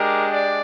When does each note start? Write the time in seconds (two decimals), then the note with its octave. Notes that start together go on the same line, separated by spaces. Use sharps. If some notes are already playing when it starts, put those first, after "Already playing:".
Already playing: G#3 D4 G4 A#4
0.31 D5